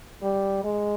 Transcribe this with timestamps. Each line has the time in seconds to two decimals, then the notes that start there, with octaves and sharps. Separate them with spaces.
0.23 G3
0.64 G#3